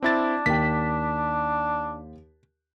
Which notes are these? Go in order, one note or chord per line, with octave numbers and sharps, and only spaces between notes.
C4 D4 E4 A6
D#2 G5 B6